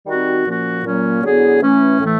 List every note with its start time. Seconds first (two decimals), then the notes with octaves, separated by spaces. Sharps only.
0.06 D#3 G3 C4 D#4 F#4
0.45 A#2 F3 A#3 C#4 F#4
0.84 A#2 F#3 A#3 C#4
1.23 D3 F#3 B3 E4 G#4
1.62 E3 A3 C#4
2.00 A2 E3 A3